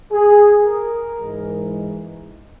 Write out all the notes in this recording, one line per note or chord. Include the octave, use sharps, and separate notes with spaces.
G#4
A#4
G#2 E3 G#3